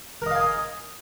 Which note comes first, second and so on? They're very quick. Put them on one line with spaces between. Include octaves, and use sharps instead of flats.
A#4 D#5 F5 G#5 D#6